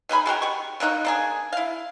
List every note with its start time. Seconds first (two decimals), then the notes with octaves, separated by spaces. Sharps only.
0.09 B2 D#4 G#4 B5
0.26 G#3 F#4 A#4 G5
0.42 G4 C#6
0.80 D3 A#3 D#4 F#4
1.05 A#3 D4 G#4
1.53 E4 F5